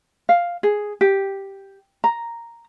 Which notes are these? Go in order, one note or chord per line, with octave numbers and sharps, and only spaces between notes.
F5
G#4
G4
A#5